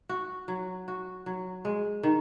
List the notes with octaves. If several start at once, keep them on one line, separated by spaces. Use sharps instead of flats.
F#4
F#3
F#4
F#3
G#3
D#3